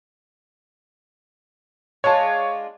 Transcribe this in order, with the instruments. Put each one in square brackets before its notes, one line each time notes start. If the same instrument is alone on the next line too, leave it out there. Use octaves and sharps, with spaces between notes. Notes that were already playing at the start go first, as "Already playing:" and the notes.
[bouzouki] G#3 D4 F4 [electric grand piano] C#5 A5